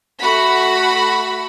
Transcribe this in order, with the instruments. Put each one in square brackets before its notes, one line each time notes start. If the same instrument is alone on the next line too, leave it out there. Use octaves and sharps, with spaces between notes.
[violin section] A3 F#4 F#5 B5 B6